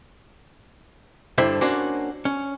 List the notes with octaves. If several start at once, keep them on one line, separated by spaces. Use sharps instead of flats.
G2 D3 E4 C5 E5
A#3 C#4 D4 F#4 C5
C#4